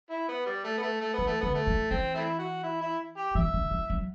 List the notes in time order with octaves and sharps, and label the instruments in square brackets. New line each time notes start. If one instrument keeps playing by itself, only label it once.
[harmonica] E4
B3
G3
A3
B3
A3
A3
[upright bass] E3 [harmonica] B3
[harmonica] A3
[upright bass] D3 [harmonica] B3
[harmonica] A3
[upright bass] E3
[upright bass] E3 [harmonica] C4
[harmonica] A3 C4 E4
F#4
E4
E4
G4
[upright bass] E3 [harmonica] E5
[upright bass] D3
E3
F#3